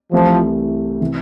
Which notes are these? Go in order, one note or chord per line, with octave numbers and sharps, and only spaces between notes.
C2 C3 E3 F3 A3
C3 E3